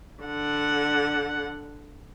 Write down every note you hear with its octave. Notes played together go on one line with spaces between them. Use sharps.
D3 F#5